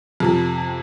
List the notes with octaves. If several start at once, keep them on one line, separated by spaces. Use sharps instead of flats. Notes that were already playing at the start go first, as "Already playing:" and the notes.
F2 C3 F3